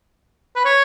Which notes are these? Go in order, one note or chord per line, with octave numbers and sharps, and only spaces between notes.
B4
C#5